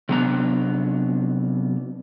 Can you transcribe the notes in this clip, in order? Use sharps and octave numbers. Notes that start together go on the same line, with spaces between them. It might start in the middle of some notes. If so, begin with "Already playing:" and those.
C3 F#3 B3 D4 A#5